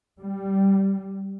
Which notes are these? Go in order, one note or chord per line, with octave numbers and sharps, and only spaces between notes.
G3